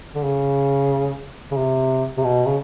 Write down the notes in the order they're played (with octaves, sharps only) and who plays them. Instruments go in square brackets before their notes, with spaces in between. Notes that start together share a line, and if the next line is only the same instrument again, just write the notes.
[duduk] D3
C#3
C#3
C3
C3
B2
C#3